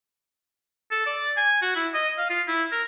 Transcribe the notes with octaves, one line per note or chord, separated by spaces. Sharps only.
A4
D5
G#5
F#4
E4
D#5
F5
F4
E4
A#4